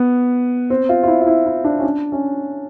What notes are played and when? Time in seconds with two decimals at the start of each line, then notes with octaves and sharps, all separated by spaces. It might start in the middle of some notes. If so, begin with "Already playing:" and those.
Already playing: B3
0.70 C4
0.89 F4
1.03 F4
1.08 E4
1.22 F4
1.27 E4
1.46 E4
1.64 D4
1.79 C#4
1.83 D4
2.12 C#4